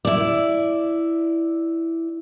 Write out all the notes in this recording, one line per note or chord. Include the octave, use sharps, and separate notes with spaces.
E4 D5